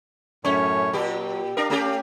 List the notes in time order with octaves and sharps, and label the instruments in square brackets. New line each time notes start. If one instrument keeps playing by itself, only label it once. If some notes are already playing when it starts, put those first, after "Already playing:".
[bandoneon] F#2 A2 C#5 [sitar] C#4
[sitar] A#2 G4 [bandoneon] F#3
[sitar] D4 A#4 [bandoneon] F5
[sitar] A3 C#4 G4